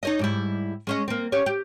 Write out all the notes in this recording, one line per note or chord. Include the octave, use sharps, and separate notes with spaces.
D#4 C#5 D#5
G#2 G3 E4
G#3 C#4 D#5
A#3 C4
C#4 G4 C#5
G4